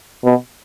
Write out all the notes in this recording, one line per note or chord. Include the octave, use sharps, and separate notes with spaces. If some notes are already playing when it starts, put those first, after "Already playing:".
B2